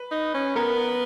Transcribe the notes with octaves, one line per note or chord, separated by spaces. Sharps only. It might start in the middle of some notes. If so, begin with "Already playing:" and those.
Already playing: B4
D#4
C#4
B3 A#4